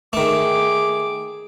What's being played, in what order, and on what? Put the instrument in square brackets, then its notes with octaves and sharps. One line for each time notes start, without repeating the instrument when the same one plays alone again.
[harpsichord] D#3 A3 [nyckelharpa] G#4 D6